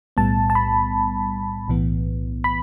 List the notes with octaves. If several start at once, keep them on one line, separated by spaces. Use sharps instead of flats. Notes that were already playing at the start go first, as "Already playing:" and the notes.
B1 A2 G3 B3 A5
A5
B5
B1 A2 E3 B3
B5